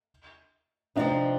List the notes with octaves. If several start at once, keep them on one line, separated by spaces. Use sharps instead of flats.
C3 F3 C4 D4 D#4